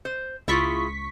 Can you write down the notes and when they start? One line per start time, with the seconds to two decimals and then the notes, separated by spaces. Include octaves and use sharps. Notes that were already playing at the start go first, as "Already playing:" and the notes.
0.05 C5
0.48 C#2 E4 F4 G#4 C#6 B6